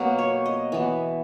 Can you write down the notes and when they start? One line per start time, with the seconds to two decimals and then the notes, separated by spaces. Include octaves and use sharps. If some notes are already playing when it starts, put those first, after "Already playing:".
Already playing: B2 F#3 A#3 A#4
0.19 C#5
0.46 D#5
0.72 E3 B3